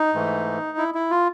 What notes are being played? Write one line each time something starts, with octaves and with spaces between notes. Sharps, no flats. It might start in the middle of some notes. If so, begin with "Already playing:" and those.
Already playing: D#4
G#2 E3 A3
E4
E4
F4